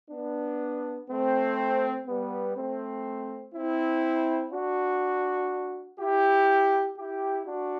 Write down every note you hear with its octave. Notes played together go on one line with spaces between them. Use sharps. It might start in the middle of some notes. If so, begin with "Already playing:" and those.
B3 D4
A3 C4
G3 B3
A3 C4
C4 E4
D4 F#4
E4 G4
E4 G4
D4 F#4